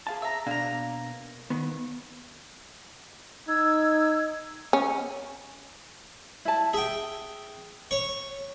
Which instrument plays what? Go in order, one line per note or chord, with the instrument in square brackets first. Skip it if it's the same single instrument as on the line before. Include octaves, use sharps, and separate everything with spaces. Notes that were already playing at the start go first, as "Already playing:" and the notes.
[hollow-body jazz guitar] G#4 F5 A5
[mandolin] E5 A#5
[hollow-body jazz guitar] B2 D4 [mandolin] A#3 A#5
[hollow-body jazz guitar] D#3 B3
[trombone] D#4 [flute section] E6 G#6
[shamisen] C#4
[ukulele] E4 A5
[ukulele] G#4 [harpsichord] E5 G5
[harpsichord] C#5 C#6